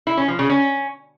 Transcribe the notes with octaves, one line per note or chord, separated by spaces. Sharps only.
E4
C#4
F3
C#3
C#4